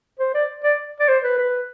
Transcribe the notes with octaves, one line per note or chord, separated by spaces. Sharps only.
C5
D5
D5
D5
C5
B4
B4